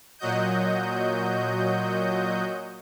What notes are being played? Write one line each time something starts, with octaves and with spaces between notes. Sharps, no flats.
A#2 F#3 F#4 D#5 G6